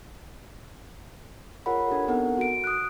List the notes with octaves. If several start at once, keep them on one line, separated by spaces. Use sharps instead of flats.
F4 G#4 A#4 C#5 F#5 B5
D4 G4 A4
B3 C4 D#4 A4 A#4 F#5
F#4 D7
D#6 F#6